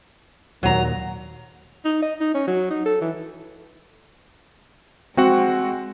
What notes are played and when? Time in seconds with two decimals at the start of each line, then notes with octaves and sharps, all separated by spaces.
0.63 D#2 A#2 F#3 A#5
1.85 D#4
2.02 D#5
2.21 D#4
2.34 C#4
2.47 F#3
2.70 D#4
2.86 A4
3.01 E3
5.17 G#3 C4 F#4 F#5